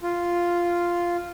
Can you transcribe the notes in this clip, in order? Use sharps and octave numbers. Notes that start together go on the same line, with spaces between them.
F4